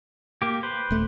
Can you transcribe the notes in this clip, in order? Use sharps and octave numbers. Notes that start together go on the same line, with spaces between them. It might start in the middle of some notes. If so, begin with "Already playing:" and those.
A#3 G4
B4 C5
D#1 A3